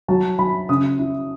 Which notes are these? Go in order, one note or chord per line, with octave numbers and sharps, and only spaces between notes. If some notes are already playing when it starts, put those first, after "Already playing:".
F#3 A5
F#3 B5
C#3 D#6
E4